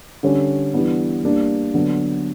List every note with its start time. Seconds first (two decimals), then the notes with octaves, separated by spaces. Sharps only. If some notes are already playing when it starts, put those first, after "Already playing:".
0.23 D3 G3 C#4
0.74 E3 G3 B3 D4
1.23 G3 A#3 D4
1.74 D3 F#3 B3 D4